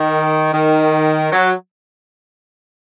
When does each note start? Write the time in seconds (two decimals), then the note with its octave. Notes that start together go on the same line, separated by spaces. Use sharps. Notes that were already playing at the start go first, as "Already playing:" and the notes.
Already playing: D#3
0.53 D#3
1.32 F#3